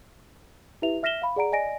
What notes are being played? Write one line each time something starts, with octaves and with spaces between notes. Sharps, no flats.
E4 G4 B4 E5 F7
E5 F6 A#6 B6 E7 G7
F5 B5
G#4 D5 F#5 A#5 D7
D5 D#5 G#5 A#6 D7